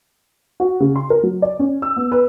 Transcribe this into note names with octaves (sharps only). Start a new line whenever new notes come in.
F#4
C#3
C6
A#4
F#3
D5
C#4
E6
B3
B4